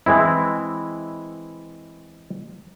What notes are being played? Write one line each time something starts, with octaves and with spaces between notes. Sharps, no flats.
E3 G#3 C4 E4